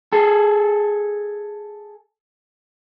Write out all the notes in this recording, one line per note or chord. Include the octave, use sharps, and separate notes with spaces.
G#4 A4